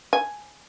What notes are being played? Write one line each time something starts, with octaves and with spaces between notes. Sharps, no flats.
G#5